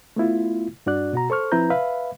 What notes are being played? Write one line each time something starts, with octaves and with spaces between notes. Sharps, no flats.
A3 B3 E4 F4
G2 D4 F#4 D5 F#6
B2 F#4 A#5
A4 C5 C#6 F6
F3 C4 E4 B4 A#5 G6
B4 E5 F5 B5